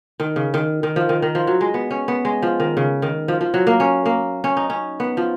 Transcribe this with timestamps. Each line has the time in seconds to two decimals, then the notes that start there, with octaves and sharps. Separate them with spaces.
0.20 D#3
0.36 C#3
0.54 D#3
0.83 D#3
0.96 F3
1.09 D#3
1.22 D#3
1.35 F3
1.47 F#3
1.61 G#3
1.74 B3
1.91 C#4
2.08 B3
2.25 G#3
2.42 F3
2.60 D#3
2.77 C#3
3.02 D#3
3.28 F3
3.41 F3
3.54 F#3
3.67 A#3
3.80 C#4
4.06 A#3
4.44 C#4
4.57 D#4
4.70 C#4
5.00 B3
5.17 F3